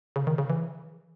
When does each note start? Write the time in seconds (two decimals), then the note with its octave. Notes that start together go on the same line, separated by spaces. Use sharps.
0.16 C#3
0.27 D#3
0.38 C#3
0.50 E3